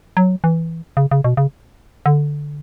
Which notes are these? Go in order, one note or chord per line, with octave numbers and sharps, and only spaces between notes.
F#3
E3
C#3
C#3
B2
C#3
D3